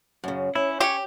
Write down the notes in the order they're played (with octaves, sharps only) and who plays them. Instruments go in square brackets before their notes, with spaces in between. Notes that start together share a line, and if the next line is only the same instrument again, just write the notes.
[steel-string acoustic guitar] F#2 C#3
[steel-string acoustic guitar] C#4 [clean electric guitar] E4
[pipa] G4 [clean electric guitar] C5 C#5